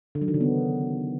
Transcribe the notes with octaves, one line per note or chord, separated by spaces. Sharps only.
D3
F#3
D#3
C#3
B3